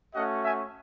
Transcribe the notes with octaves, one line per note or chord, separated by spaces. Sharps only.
A3 C#4 F#4 D#5 F#5
E5 G#5